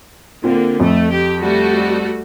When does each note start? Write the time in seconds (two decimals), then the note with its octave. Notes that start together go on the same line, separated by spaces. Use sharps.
0.44 D3 A#3 C4 F4
0.80 F2 A3
1.10 G4
1.41 G3 A3 F#4